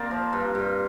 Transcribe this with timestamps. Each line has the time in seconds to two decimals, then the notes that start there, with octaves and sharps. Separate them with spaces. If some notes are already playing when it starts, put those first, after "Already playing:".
Already playing: A#3 C4 A#4 D5
0.11 F3
0.33 G2
0.55 G2